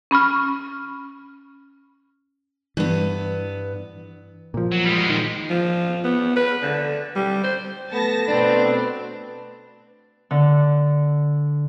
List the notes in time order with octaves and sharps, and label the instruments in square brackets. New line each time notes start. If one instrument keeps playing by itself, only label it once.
[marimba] C#4 B5 C#6 F6
[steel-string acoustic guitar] G2 B3 [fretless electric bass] E3
[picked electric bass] A#2 F3
[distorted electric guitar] F#3
G3 G#3
[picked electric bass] D#3
[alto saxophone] F3
B3
B4
D3
G3
C5
[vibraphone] A3 A4 [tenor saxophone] B3 [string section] A5 A#6
[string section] B2 C4 [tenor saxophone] D4 [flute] B4
[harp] D3